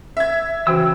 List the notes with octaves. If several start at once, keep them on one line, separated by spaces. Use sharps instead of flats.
E5 G#6
C#3 E3 F#4 C5 G5 E6